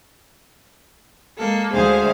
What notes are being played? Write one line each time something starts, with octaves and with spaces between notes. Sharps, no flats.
G#3 A#3 A4
D2 G#3 G#4 C5 F5